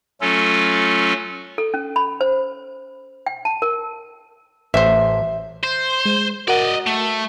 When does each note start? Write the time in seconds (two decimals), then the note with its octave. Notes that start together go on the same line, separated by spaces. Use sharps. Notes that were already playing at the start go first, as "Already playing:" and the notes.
0.21 F#3 A3 C#4 F4 A4
1.58 A4
1.74 C#4
1.96 B5
2.21 C5
3.26 G5
3.45 A5
3.62 A#4
4.74 A1 C5 E5
5.63 C5
6.05 G#3
6.48 F#4 A#4 D5 D#5 F#5
6.87 A3